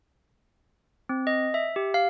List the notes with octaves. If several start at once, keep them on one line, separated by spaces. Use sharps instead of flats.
C4
D#5
E5
G4
F5